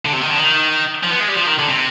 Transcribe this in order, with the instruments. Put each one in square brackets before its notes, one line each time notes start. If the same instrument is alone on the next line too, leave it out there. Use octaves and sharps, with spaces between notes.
[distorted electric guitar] D3
C3
D#3
D3
D#3
F3
B3
G#3
G3
F3
D#3
D3
C3